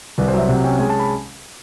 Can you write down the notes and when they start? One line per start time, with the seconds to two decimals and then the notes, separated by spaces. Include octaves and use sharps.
0.18 C2 B4
0.28 C5
0.34 F#3 E5
0.49 C3 F#5
0.64 C#4 G5
0.79 G#3 G#5
0.90 A5
0.99 B5